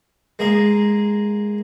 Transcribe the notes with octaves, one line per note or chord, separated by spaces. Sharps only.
G#3 A#3 G#4 A#4